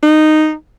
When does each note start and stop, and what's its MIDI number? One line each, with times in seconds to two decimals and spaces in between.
0.03 0.53 63